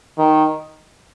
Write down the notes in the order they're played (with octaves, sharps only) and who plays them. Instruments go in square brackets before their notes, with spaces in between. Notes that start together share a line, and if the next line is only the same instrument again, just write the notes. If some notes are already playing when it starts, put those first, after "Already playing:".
[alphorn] D#3